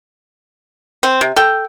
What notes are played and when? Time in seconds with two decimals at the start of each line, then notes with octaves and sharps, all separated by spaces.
1.03 C4
1.21 C3
1.36 A4 G5